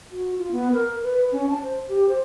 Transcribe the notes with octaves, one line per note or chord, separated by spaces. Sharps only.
F#4
F4
B3
A#4
B4
C#4
A5
C5
G4
C5